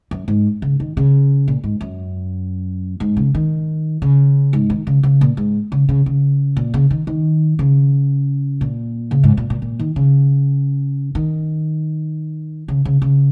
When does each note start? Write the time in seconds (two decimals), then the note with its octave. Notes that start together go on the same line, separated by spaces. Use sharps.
0.11 F#2
0.28 G#2
0.62 C#3
0.80 D#3
0.97 C#3
1.48 A#2
1.64 G#2
1.81 F#2
3.00 G#2
3.17 C#3
3.35 D#3
4.02 C#3
4.53 G#2
4.70 D#3
4.87 C#3
5.03 C#3
5.21 A#2
5.37 G#2
5.72 C#3
5.89 C#3
6.06 C#3
6.57 A#2
6.74 C#3
6.91 D#3
7.07 D#3
7.59 C#3
8.61 A#2
9.11 C#3
9.24 G#2
9.37 A#2
9.50 A#2
9.62 A#2
9.79 D#3
9.96 C#3
11.15 D#3
12.68 C#3
12.85 C#3
13.02 C#3